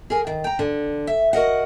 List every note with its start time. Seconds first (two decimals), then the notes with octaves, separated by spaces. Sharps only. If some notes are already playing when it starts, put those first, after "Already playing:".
0.10 G#4 A#4 G#5
0.27 D#3
0.44 G5 A#5
0.59 D3
1.07 E5
1.33 F#4 A#4 D#5 F#5